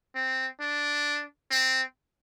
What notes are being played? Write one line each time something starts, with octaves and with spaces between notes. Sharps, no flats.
C4
D4
C4